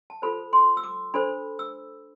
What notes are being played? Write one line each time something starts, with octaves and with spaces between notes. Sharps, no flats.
A5
F4 A4 C5 B5
C6
E6
D6
D4 A4 C5 B5
E6